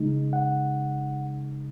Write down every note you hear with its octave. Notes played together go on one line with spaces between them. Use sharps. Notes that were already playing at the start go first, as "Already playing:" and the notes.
Already playing: C#3 G#3 D#4
F#5